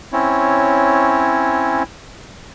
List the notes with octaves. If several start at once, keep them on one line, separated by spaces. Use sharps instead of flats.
C4 C#4 E4 C#5